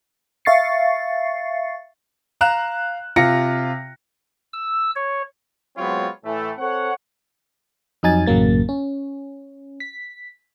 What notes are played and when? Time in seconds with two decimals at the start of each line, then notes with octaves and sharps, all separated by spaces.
0.45 E5 F5 C#6 A6 C7 C#7
2.41 F5 A#5 F#6 E7
3.16 C3 F4 A#6 C#7
4.53 E6
4.96 C#5
5.77 F#3 G#3 B3 C4 F4 C#5
6.23 A2 E3 A3
6.58 C4 A4 C#5 F#5
8.03 F2 F#3 D#4 G#5 A6
8.26 A1 F#2 C#3 F#3 A#3 A6
8.69 C#4
9.80 B6